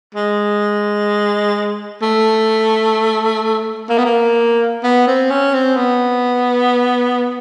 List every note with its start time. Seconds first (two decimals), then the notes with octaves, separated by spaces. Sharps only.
0.15 G#3
2.02 A3
3.90 A#3
3.98 B3
4.05 A#3
4.83 B3
5.07 C4
5.30 C#4
5.54 C4
5.76 B3